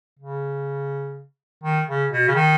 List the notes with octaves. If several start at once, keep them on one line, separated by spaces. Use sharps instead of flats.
C#3
D#3
C#3
B2
C#3
D#3